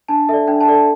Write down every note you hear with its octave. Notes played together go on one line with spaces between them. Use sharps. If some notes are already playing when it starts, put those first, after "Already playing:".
D4 A5
A4 D5 E5
D4 G5
A5
A4 D5
A5